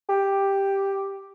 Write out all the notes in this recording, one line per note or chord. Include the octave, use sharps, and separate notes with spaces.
G4